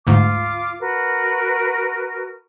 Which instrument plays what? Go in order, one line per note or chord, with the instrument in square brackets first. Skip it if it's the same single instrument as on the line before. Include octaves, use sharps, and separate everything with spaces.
[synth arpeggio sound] D2 G#2 [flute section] F4 D6
[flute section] F#4 A#4 B4